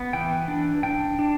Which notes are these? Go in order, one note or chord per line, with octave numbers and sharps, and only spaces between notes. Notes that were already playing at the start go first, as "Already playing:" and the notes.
Already playing: B3
E3 G5
D4
D4 G5
D4